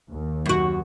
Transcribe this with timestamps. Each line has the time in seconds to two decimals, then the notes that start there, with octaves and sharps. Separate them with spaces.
0.10 D#2
0.46 F#2 F#4